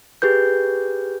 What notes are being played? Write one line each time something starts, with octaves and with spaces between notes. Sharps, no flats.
G4 G#4 B4 G6